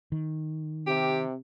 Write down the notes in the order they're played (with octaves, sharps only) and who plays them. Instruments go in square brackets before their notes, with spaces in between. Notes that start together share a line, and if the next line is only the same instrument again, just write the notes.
[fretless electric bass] D#3
[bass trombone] C3 [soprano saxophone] G4